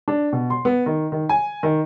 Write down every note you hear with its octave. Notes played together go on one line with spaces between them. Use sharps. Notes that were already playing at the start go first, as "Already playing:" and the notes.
D4
B2
C6
B3
D#3
D#3
G#5
D#3